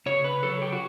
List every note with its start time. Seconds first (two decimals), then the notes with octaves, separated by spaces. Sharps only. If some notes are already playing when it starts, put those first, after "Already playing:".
0.06 C#3 C#5
0.24 B4
0.43 F#3 A4
0.62 G4
0.73 F#4